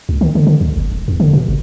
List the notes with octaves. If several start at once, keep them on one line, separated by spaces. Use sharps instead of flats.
C#2
D#3
D3
D3
D2
F#1
D#1
E2
D3
B2
F#1